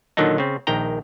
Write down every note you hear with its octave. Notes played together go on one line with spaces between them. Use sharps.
A#2 D3 D#3 F#3 D4 D#4
C#3 C4
A#1 D#3 G5 A#5